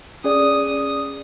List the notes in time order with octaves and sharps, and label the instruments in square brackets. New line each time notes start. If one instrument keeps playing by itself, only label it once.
[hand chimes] C#4 G#4 D5 [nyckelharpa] D#6